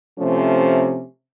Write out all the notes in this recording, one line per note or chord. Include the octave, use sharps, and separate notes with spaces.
C3 F3 A3 C#4